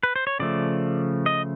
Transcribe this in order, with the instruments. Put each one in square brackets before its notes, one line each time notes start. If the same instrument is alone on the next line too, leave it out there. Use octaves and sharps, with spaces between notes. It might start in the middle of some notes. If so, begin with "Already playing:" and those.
[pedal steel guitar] B4
C5
C#5
C#3 F3 A3 D5
D#5